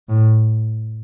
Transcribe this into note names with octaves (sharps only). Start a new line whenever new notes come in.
A2